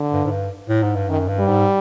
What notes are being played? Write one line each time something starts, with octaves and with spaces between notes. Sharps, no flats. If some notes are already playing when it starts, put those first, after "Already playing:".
Already playing: D3
G2
G#2
G2
A2
G#2
G2
F#2 D#3
G2
G3
G#2